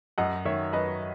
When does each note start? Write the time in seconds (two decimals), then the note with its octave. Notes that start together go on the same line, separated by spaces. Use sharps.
0.18 F#2 D#5 F#5
0.45 D#3 C#5 E5
0.73 F#2 B4 D#5